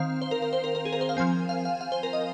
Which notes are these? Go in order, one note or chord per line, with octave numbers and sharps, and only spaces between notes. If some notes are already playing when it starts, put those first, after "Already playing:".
Already playing: D#3 C4 F5
C5
A#4
A#4
C5
A#4
A#4
G#4
A#4
C5
F5
F3 C4 G#5
F5
F5
F5
C5
A#4
D#5